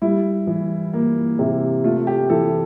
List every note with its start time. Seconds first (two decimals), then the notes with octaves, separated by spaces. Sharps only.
0.02 G3 E4
0.47 E3
0.93 A#3
1.39 C3
1.84 A3 F4
2.07 G4
2.30 E3 A4